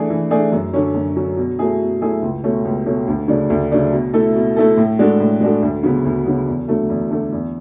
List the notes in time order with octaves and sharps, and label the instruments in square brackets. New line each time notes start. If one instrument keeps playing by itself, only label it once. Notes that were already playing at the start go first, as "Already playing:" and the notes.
Already playing: [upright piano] E3 A3 D4 G#4
E3
A3 D4 G#4
F#2
D3 F#3 C#4
F#2
D3 F#3 C#4
B2
F#3 A3 E4 G#4
B2
F#3 A3 E4 G#4
C#2
B2 A3 C#4
C#2
B2 A3 C#4
D2
C#3 F#3 A3 D4
D2
C#3 F#3 A3 D4
B2
A3 E4 A4
B2
A3 E4 A4
A2
G#3 D4 F#4 A4
A2
G#3 D4 F#4 A4
D2
C#3 F#3 B3
D2
C#3 F#3 B3
E2
D3 F#3 A3
E2
D3 F#3 A3
E2